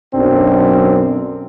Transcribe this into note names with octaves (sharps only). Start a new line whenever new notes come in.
B1 F#2 C4 D4